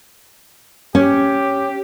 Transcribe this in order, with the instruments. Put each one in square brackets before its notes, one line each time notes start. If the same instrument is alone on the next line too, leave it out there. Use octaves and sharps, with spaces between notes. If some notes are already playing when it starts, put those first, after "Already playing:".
[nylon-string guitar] C#4 [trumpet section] G4